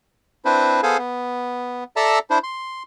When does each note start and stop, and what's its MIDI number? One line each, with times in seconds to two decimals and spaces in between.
0.45 0.81 60
0.45 0.81 62
0.45 0.81 64
0.45 0.81 71
0.45 0.81 72
0.83 0.97 59
0.83 0.97 68
0.83 0.97 69
0.83 0.97 72
0.83 0.97 77
0.83 0.97 80
0.98 1.84 59
1.96 2.19 69
1.96 2.19 74
1.96 2.19 76
1.96 2.19 81
1.96 2.19 82
2.30 2.39 62
2.30 2.39 64
2.30 2.39 72
2.44 2.83 84